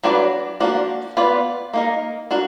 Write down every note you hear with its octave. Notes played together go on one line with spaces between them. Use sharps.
F#3 D4 F#4 B4 D5
F3 A#3 D4 F#4
B3 F4 B4 D5
A#3 D#4 A#4
D4 F#4 A#4